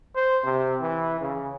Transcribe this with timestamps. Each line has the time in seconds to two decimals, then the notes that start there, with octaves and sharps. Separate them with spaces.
0.16 C5
0.44 C3
0.81 E3
1.20 C#3